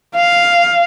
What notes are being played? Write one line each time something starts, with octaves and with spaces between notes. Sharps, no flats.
F5